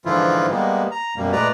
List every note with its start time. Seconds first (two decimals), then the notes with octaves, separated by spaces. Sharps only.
0.05 G#2 D3 E3 F3 E4 F4
0.50 G3 G#3 A#3 B3
0.91 A#5
1.16 F#2 B2 G3 A#3
1.32 A#2 G#3 A3 B4 D5 A#5